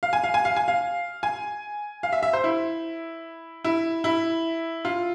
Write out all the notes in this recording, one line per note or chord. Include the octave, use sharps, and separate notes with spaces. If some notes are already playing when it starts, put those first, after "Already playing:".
F5
G#5
F5
G#5
F5
G#5
F5
G#5
F5
E5
E5
C5
E4
E4
E4
F4